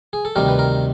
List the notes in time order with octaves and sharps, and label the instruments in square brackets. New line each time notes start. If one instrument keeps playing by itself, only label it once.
[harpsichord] G#4
A4
D2 C3 D#3 G3 A#4
B4
A#4